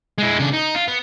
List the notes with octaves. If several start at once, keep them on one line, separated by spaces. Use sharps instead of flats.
G#3 E4
C#3 D4
D#4
F4
B3